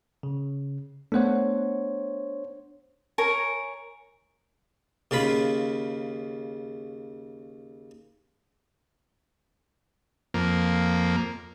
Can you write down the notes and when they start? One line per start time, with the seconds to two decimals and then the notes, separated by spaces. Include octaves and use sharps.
0.23 C#3
1.12 A3 B3 D4 C5 C#5 F#5
3.18 A#4 C#5 G#5
5.11 D#2 C#3 F4 B5
10.34 F2 A#3